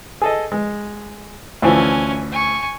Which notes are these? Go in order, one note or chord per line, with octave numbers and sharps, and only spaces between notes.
G#4 A4 D#5
G#3
D2 E3 F3 C#4 G#5
G#5 C#6